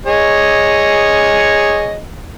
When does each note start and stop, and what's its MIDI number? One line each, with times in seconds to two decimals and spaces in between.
0.06 1.99 68
0.06 1.99 73
0.06 1.99 75